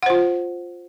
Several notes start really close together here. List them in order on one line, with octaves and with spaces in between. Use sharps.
F#5 C5 F4